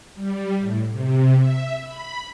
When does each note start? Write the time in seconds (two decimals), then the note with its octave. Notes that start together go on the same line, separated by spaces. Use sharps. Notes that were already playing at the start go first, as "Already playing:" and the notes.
0.15 G3
0.59 A2
0.90 C3
1.37 E5
1.83 B5